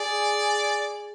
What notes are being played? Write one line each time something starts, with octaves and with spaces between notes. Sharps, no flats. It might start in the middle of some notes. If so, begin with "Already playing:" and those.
Already playing: G#4 D5